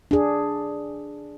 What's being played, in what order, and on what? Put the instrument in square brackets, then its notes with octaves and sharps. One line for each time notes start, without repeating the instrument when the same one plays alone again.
[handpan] D4 G#4